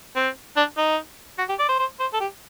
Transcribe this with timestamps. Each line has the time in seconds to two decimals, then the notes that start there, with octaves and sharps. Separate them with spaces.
0.16 C4
0.57 D4
0.78 D#4
1.38 F#4
1.49 G4
1.59 D5
1.69 C5
1.79 C5
2.00 C5
2.14 A4
2.21 G4